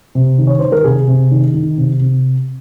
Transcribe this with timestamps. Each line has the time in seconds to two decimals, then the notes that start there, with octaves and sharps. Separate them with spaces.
0.15 C3
0.38 D#3
0.47 C#5
0.59 D#3 C5
0.72 A#4
0.84 C3 G#4
1.07 C3
1.31 D#3
1.54 D#3
1.78 C3
2.00 C3